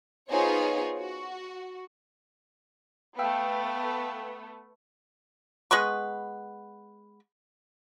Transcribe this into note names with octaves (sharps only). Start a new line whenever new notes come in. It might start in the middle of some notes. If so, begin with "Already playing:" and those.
B3 D#4 F4 G#4 C5 C#5
F#4
A3 B3 F5 G5 E6
G#3 B3 B4 C#6